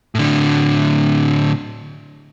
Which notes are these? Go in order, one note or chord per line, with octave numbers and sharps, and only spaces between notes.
A2 D3